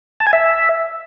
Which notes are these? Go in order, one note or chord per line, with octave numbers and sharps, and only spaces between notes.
A5
G#5
E5